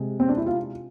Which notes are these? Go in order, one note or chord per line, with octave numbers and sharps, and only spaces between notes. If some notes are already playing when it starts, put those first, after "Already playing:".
Already playing: C3 G#3
C4
D4
E4
F4